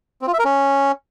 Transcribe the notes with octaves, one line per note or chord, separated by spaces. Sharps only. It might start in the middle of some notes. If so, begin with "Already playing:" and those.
C4
F4
E5
A#4
C#4